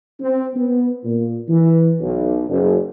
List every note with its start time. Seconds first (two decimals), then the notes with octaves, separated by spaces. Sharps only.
0.20 C4
0.55 B3
1.04 A#2
1.49 E3
2.01 B1
2.48 F#1